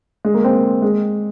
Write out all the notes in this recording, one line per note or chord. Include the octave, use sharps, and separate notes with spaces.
G#3
A#3
C4
G#3